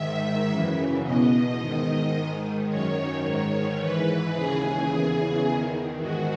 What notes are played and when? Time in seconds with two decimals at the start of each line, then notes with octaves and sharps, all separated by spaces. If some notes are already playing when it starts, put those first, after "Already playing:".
Already playing: G#2 D#3 E5
0.49 F#2 C#3 E3
1.03 E2 B2 D#5
1.59 G#2 D#3
2.13 G#2 D#3
2.69 F#2 D#3 C#5
3.24 G#2 D#3
3.79 G#2 E3 B4
4.34 D#2 C#3 E3 G#4
4.89 E2 C#3 E3
5.44 E2 D#3
6.00 G#2 D#3 F#4